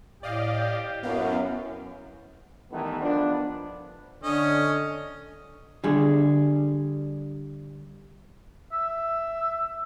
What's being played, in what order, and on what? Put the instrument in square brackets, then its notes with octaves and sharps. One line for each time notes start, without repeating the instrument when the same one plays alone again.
[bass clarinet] A2 [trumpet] G4 [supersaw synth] D5 D#5 F5
[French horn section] F#2 [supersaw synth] B3 F5 [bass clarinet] E4
[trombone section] D#3 E3 G3 A3 B3
F3 B3 D4
[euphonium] D3 [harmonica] C#4 D#5
[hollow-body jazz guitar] D3 G3 G#4
[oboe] E5